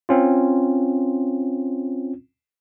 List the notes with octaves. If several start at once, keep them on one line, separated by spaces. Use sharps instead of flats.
C4 C#4 F4